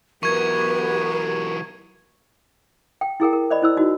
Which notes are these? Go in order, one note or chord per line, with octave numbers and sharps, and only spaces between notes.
E3 F#3 B3 G4 A#4 C#6 G#6
G5
E4 G#4 A#4 G5
A#4
C5 D5 D#5 B5
E4 C5 E6
D#4 F#4